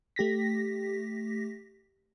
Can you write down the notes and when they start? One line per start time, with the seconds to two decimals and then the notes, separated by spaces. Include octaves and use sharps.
0.16 A3 G4 A#6 B6